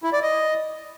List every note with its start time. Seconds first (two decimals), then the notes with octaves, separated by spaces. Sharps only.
0.03 E4
0.13 D5
0.22 D#5